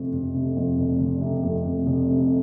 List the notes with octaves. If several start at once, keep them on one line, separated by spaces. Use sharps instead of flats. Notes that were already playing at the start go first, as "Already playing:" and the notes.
Already playing: F1 F2 C3
F1
C3
F2
F1
F1
C3
F2
F1
F1
C3